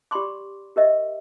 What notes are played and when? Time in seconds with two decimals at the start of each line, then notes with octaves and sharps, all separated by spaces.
0.11 G4 D5 B5 C6 D6
0.76 G4 A#4 D#5 E5